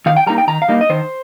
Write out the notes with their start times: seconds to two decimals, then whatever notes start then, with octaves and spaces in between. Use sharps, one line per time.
0.06 D#3 F5
0.17 G5
0.27 G3 A#3 D#4 A#5
0.38 G5
0.48 D#3 A#5
0.62 F5
0.68 G3 A#3 D#4
0.81 D#5
0.90 D#3 C5